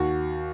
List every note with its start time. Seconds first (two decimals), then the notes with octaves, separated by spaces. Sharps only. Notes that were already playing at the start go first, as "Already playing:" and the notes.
Already playing: D#2 F#4